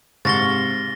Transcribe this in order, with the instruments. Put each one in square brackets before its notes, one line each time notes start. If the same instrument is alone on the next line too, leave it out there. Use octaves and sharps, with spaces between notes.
[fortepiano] G#2 [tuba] C3 [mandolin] F5 C#6 [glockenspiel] A6 A#6 G7